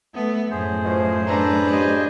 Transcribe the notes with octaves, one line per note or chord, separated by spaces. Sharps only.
A3 B3
F#2 A2 G#4 C5
B2 F3 A3
D4 A4 B4 A#5
F2 C#3 G4 C5 D#5 G#5